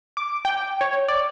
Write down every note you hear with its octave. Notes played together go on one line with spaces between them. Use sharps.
D6
G5
C#5
D5